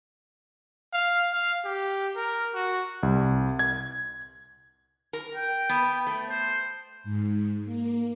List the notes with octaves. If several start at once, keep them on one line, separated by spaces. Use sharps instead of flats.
F5
F5
G4
A#4
F#4
C2
G#6
A#4
G5
B3
A3
C5
G#2
A#3